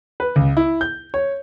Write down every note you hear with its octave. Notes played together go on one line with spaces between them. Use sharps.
B4
C#2
E4
G6
C#5